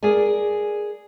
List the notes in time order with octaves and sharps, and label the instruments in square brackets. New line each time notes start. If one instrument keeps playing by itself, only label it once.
[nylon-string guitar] G#4 A#4 D5 G#5